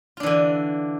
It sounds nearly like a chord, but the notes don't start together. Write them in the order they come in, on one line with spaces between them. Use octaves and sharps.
F4 D4 E3 D3